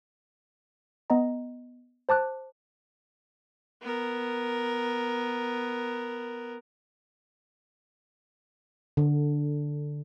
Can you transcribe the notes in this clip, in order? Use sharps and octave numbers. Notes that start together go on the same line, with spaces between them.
B3 D#5 A#5
C5 A5 D6 F#6
B3 A#4
D3